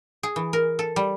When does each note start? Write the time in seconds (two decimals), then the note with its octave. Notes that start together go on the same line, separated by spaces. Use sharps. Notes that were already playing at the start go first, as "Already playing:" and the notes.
0.23 G#4
0.36 E3
0.53 A#4
0.79 A4
0.96 G3